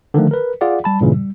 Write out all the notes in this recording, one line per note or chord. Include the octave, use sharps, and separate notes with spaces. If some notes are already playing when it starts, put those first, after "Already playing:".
D3 D#3 F3 A3
A#4 B4
F4 G#4 D5 F5 F#5
G3 A5 B5
G2 A#2 C#3 E3
G3